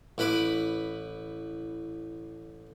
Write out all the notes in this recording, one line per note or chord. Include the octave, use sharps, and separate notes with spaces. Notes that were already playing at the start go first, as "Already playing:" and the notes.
A1 E4 B4 B5 D6